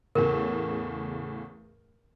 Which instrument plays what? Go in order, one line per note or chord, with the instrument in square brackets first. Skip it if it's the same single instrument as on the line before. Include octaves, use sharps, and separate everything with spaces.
[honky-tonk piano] E2 A2 C#3 [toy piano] A#4